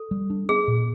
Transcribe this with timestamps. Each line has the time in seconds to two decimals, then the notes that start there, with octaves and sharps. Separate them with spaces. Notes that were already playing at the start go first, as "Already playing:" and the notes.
Already playing: A4
0.11 G3
0.30 D4
0.49 B3 G#4
0.68 A#2